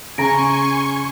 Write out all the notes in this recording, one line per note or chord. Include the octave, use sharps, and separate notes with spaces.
C#3 G#5 A#5 C6 C#6 A#6 D7